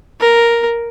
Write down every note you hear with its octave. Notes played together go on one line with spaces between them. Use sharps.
A#4